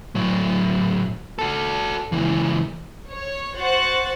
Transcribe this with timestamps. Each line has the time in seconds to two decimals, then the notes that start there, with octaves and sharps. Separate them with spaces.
0.15 A2 F#3
1.39 F#4 A4
2.12 C#2 E3
3.09 C#5
3.56 F#4 C5 F#5 F#6 A6